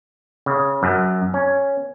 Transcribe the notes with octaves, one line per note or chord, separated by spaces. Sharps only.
C#3
F#2
C#4